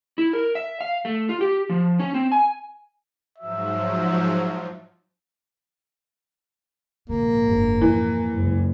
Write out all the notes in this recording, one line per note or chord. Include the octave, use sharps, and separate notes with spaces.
E4
A#4
E5
F5
A3
F4
G4
F3
C#4
C4
G#5
G#2 F3 F#3 E5
A#1 G#2 C#3 A#3
F#1 D4
F2 E3
F#1 C#2